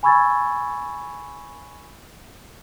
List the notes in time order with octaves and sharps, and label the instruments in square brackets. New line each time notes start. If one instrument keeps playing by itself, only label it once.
[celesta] G#5 B5 C#6 E6 G#6 A6